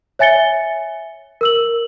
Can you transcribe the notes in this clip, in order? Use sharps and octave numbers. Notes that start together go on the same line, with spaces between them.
C#5 E5 G#5 A6 C#7 G7
A#4 E6 F#7